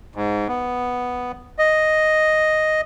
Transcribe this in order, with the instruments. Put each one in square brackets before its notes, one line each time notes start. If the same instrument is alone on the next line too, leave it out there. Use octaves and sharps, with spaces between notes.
[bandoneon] G#2
B3
D#5